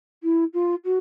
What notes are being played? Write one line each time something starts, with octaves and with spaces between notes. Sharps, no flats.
E4
F4
F#4